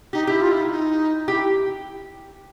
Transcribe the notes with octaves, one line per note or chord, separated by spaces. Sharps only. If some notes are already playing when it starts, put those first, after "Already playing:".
D#4 G4
E4 G4
F4
E4
D#4
D#4
E4 G4